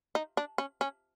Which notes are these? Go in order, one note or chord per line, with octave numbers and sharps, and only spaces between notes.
D#4
D4
C#4
C#4